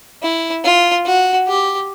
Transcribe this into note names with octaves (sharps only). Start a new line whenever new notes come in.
E4
F4
F#4
G4